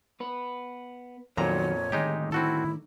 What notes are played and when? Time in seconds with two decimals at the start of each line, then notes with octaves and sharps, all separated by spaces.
0.20 B3 B4
1.37 F2 A#2 D#3 F#3 B3 C#5 A#5
1.92 A2 D3 D#3 G#3 D#4 G4
2.32 C4 E4 F#4 A4